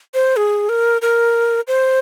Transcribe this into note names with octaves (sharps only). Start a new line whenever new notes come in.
C5
G#4
A#4
A#4
C5